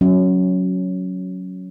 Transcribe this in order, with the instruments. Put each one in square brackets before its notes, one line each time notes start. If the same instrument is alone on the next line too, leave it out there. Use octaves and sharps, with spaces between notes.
[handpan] F#3 C#4